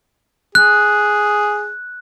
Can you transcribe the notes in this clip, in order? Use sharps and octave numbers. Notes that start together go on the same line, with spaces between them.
G#4 F#6